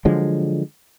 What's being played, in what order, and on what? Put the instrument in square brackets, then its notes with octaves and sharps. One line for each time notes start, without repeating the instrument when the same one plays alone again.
[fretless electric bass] D3 F3 F#3 G#3